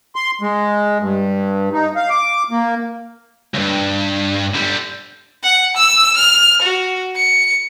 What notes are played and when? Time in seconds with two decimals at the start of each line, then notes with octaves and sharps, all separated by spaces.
0.15 C6
0.41 G#3
1.00 G2
1.73 D#4
1.96 F5
2.10 D6
2.51 A#3
3.54 C#2 G2
4.55 D3 G3
5.43 F#5
5.77 E6
6.17 F6
6.62 F#4
7.16 C#7